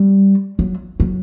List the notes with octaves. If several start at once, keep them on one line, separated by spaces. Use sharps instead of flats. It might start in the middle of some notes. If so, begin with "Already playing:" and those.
Already playing: G3
F#3
F#3